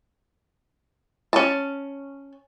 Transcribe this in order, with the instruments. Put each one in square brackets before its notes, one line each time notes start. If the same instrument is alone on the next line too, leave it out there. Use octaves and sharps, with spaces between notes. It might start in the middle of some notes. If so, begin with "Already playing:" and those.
[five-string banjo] C#4 A5